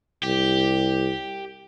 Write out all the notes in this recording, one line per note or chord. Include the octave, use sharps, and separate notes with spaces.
C2 G4